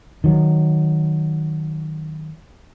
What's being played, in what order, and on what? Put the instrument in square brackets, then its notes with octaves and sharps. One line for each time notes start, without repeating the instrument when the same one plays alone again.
[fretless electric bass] D#3 F#3